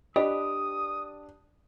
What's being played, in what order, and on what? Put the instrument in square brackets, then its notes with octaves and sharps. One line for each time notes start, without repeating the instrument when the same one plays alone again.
[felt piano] D4 [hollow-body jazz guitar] G4 B4 [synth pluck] D#5 [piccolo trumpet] D#6